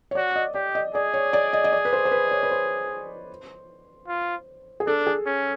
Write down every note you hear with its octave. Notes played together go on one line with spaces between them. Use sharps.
C#5
F#4 D5
D#5
G4 D5
D#5
G#4 D5
C#5
D5
D#5
D#5
D5
B4
C5
C5
B4
C#5
B4
C5
F4
G#4
D4 A4
G#4
C#4